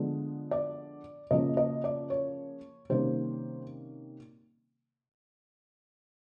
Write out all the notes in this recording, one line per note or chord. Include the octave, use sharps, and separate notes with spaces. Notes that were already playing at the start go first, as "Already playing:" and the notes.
Already playing: D3 F3 G#3 B3
D5
C#3 F3 A#3 C#4 D#5
D#5
D5
C#5
C3 D#3 G3 A#3 C#4 C5